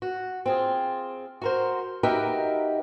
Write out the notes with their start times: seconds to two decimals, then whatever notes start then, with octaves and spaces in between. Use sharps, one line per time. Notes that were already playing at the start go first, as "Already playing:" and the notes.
0.02 F#4
0.46 C4 F4 G#4
1.42 F#4 A#4 C5
2.03 D#4 F#4 G4 A#4 B4 E5